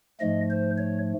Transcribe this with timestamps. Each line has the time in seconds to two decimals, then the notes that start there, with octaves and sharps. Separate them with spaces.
0.20 G#2 F3 A3 D#5
0.50 C5
0.78 C#5